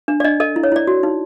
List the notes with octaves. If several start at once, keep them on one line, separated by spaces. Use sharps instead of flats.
D4
D5
D4 D#5
A4 D#5
E4
C#5
E4 D5
F#4
D#4